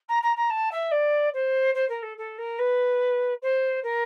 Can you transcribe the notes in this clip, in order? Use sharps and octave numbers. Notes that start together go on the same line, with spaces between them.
A#5
A#5
A#5
A5
E5
D5
C5
C5
A#4
A4
A4
A#4
B4
C5
A#4